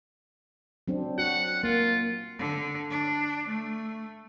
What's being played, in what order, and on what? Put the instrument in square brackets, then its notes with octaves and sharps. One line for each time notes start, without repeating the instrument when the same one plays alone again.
[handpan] F#3 C4 D4
[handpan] F#4 [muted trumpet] F#5
[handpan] A#3 [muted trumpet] F4
[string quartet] D3
D4
A3